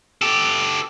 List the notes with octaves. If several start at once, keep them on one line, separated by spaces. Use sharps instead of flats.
G4 A4